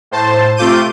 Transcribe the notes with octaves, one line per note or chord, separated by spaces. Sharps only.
A2 C5 A5
C3 A3 F4 D6 G6 D#7